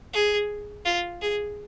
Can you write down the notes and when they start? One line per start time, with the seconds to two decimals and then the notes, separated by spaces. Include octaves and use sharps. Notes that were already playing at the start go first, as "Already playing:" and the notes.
0.14 G#4
0.85 F4
1.22 G#4